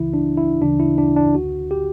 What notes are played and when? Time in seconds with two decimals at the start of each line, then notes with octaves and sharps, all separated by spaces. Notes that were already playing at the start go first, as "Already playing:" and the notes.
Already playing: C#2 C#3 E3 E4
0.14 D4
0.37 E4
0.61 D2 C#3 E3 D4
0.80 E4
0.98 D4
1.16 D4
1.35 D2 D3 F#4
1.71 G4